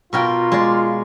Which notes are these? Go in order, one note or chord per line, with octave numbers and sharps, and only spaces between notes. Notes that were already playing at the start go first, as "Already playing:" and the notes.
B2 F4 A#4 G5
G#3 D5